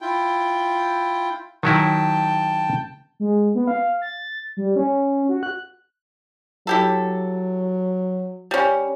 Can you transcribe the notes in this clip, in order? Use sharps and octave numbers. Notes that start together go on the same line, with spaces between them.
E4 F4 G5
D#3 F#3 E4 G5 A5
G#3
B3
F5
A6
G3
C#4
F#4
F#6
F#3 E4 G4 A4
G3 C#4